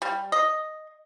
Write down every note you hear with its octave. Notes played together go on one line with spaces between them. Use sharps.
G3
D#5